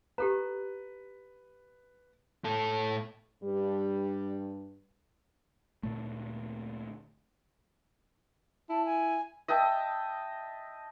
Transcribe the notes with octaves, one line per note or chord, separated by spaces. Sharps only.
G4 A4 B4 A#5
A2 A4
G2 G3
D2 A#2 A3
E4 A5
G#5
D#5 E5 G5 A5